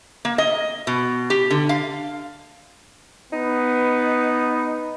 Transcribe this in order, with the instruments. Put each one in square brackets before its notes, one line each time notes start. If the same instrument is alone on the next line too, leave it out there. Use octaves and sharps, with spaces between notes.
[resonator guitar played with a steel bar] A#3
D#5
B2
G4
D3
F5
[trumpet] B3 [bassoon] D#4